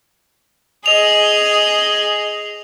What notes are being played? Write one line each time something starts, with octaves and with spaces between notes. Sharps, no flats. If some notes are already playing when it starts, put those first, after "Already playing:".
G#4 D#5 F7